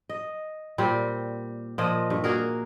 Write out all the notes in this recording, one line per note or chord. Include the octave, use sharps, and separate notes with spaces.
D#5
A#2 G3 C4
A#2 F3 D#5
G2
A#3 F#4 G#4 A#4